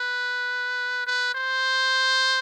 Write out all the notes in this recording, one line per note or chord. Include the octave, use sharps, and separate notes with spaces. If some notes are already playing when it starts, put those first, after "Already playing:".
Already playing: B4
B4
C5